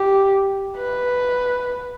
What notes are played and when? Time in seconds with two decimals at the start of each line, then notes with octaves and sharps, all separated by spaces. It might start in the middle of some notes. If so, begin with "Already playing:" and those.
Already playing: G4
0.77 B4